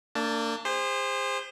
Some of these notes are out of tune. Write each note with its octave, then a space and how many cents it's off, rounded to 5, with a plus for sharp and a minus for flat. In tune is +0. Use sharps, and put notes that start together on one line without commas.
A#3 -35 D4 +0 A5 +0
G#4 -40 C5 +0